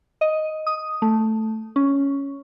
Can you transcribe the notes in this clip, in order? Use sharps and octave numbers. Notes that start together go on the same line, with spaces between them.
D#5
D#6
A3
C#4